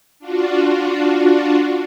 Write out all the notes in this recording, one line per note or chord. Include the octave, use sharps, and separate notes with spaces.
D4 F4 F#4